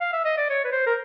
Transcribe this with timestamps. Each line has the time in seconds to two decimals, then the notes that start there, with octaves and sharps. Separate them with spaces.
0.01 F5
0.13 E5
0.25 D#5
0.38 D5
0.50 C#5
0.65 B4
0.72 C5
0.87 A#4